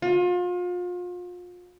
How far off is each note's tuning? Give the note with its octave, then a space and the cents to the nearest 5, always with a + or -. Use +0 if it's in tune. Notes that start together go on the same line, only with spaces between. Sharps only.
F4 +35